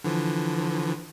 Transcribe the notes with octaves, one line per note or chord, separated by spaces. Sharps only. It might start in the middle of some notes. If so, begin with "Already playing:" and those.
D3 E3 F3